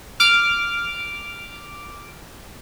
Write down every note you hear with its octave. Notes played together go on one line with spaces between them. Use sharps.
D6 F6